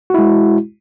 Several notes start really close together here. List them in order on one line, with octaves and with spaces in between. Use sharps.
F#4 E4 G#3